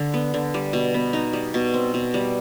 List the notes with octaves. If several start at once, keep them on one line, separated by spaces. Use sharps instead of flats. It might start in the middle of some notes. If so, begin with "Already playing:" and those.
Already playing: D3
B3
D3
G3
B2
B3
D#4
G3
B2
C4
B2
G3